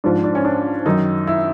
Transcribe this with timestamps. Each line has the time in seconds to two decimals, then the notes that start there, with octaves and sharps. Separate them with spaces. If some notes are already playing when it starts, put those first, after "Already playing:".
0.04 G#2 F3 D4
0.24 D4
0.35 C#4
0.45 D4
0.86 F#2 D#3 D#4
1.27 E4